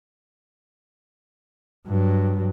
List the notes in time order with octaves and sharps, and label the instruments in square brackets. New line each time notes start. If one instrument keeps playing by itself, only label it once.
[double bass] G2 F#3